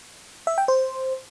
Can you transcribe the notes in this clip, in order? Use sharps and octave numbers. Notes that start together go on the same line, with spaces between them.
E5
G5
C5